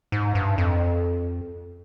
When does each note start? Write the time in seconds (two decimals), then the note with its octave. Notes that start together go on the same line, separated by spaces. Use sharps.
0.12 G#2
0.35 G2
0.58 F2